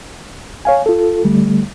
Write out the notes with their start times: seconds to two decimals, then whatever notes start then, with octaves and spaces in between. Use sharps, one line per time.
0.65 C#5 F5 G#5
0.86 F4 A4
1.25 D3 G3 A3